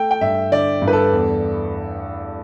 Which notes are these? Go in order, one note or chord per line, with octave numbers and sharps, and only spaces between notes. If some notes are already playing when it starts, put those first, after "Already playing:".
Already playing: A3 G5
G5
G2 E5
D3 D5
G2
B4
A4
E2